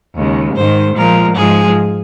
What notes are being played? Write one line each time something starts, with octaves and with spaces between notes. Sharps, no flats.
D#2 C#3 G#3
G#2 D#3 G#3 C5
A#2 F3 G#3 A#4
G#2 F3 G#3 G#4